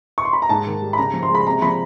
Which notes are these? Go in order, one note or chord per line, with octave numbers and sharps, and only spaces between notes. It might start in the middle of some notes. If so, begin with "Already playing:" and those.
C#6
C6
B5
A#5
G#2 A5
D#3
G3
B5
C#3 A#5
F3
C6
G#3 B5
C3 A#5
F3 B5